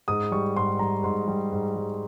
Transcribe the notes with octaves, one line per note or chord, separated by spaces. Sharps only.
G#2 D#6
G3 C#6
G#2 C6
G3 A#5
G#2 C6
G3
G#2
G3